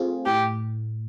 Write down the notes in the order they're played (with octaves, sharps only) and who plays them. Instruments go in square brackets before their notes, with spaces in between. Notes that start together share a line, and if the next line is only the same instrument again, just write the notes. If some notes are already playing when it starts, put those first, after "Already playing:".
Already playing: [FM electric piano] A3 C4 F4 G#4
[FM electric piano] A2 [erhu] G4